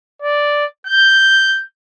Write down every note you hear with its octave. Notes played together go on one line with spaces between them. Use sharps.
D5
G6